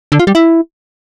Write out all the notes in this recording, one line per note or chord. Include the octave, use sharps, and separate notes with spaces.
D3
F4
G3
E4